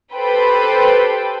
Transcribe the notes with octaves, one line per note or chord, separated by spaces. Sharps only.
G4 A4 B4 C5 G5 B5